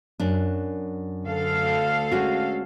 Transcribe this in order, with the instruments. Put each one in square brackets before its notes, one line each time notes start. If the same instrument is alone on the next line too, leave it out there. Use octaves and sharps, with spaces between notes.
[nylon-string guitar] F#2 D4
[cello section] D2 A4 F5
[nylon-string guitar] G#3 C#4 F#4